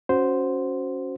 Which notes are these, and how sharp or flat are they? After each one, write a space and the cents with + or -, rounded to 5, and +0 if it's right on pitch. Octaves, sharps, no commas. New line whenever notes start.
C#4 +0 F#4 +0 C5 -5